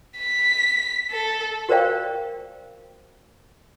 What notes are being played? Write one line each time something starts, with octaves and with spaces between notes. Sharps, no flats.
B6
A4
F#4 A#4 C5 D5 F5 G5